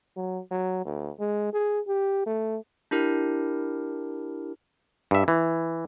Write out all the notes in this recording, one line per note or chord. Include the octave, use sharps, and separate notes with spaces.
F#3
F#3
D2
G#3
G#4
G4
A3
D4 E4 G4 A#4
G2 E5
E3